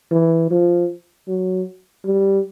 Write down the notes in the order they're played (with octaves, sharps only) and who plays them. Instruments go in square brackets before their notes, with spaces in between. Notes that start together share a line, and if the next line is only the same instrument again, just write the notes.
[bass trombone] E3
F3
F#3
G3